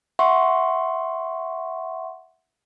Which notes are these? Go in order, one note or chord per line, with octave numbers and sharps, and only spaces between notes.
E5 F#5 C6 C#6